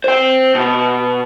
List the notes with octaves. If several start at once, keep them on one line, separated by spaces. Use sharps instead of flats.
C5 G5
B2